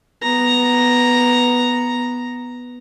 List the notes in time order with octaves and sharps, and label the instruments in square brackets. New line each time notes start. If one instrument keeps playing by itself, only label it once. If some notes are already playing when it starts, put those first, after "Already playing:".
[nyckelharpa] B3 A#5